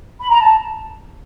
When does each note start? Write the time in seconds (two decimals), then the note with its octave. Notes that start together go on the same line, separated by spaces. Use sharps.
0.19 B5
0.29 A#5
0.40 A5